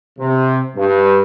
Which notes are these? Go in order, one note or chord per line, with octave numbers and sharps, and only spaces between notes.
C3
G2